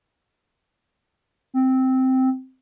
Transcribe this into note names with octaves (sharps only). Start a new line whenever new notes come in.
C4